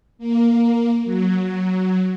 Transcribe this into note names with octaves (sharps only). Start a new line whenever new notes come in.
A#3
F#3